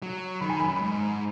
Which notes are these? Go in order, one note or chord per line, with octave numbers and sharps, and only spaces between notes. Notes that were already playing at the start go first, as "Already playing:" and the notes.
F#3
D#3 B5
G#5
F#2 B5
G#2